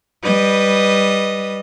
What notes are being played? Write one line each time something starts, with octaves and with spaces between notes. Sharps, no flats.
G3 B4 D#5